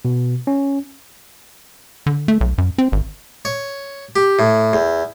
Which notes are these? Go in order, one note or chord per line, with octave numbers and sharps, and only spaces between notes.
B2
C#4
D3
A3
B1
F#2
C4
G#1
C#5
G4
A2
E2